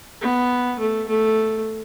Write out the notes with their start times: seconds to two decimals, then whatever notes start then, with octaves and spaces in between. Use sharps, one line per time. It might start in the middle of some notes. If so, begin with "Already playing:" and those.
0.21 B3
0.79 A3
1.08 A3